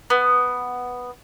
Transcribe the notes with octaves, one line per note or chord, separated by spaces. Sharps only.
B3